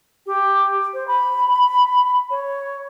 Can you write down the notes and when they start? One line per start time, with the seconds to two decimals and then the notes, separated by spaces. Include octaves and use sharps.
0.26 G4
0.94 C5
1.08 B5
2.30 C#5